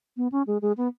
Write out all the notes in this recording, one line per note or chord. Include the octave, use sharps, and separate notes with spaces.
B3
C#4
G#3
G#3
B3